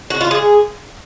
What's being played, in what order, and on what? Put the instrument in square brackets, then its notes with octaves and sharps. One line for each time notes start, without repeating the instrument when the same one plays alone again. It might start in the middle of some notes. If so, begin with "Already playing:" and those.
[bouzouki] F#4
F4
G#4